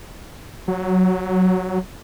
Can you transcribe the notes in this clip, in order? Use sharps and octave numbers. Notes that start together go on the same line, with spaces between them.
F#3